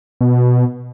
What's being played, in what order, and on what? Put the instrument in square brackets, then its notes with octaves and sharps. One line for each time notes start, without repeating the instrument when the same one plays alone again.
[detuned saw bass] B2